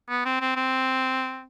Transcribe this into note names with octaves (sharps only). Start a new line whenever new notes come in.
B3
C4
C4
C4